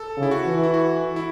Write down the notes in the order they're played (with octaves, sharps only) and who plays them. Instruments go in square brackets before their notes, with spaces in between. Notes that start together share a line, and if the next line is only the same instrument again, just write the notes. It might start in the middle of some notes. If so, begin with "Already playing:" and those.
Already playing: [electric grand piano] A4
[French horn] C#3
[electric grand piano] E4
F#4
[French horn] E3
[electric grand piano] E4
F#4
E4